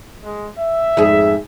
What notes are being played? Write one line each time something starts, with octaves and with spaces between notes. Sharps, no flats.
G#3
E5
F2 G#2 G#4